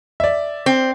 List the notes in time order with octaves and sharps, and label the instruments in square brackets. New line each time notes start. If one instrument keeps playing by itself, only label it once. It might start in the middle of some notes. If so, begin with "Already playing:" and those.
[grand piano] D5 E5
[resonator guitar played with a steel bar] C4